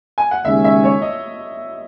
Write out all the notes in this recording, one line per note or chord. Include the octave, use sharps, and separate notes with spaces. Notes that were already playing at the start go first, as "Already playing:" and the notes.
G#5
F#5
D#2 C#3 G#3 C#4 E5
E5
C#5
D#5